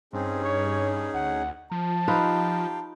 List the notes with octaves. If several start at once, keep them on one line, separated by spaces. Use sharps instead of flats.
G2 C4 C#4 D#4 G#4
C#5
D2 F#5
F3 A5
D#4 F4 G4 B4 F5 G5